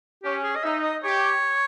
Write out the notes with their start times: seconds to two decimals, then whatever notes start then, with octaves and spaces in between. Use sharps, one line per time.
0.23 C#4 G4
0.43 G#4
0.56 D#5
0.64 D#4 E5
0.83 D#5
1.04 G4 C#5